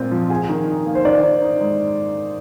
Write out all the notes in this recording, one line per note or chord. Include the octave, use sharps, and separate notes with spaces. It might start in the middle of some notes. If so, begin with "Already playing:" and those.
Already playing: A#2 G#3 C4 F4
F3
G#4
D#3
D#4
A#3
C5
D#3 D5
D#3
D#4
G#3